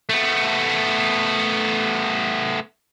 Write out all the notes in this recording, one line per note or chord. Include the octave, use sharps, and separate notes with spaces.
A3 B3